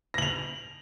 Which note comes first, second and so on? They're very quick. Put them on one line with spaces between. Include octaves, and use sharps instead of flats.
A#6 F#7 F7